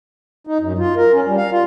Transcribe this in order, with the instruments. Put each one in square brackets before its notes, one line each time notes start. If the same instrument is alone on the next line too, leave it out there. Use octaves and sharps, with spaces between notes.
[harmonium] D#4
F#2
F4
A#4
C#4
G3
F5
F4